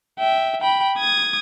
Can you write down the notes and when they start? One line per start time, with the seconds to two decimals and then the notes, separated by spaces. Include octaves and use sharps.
0.19 E5 G5
0.61 G5 B5
0.98 D#6 G#6